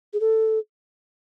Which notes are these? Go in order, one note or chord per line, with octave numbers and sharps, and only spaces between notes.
G#4
A4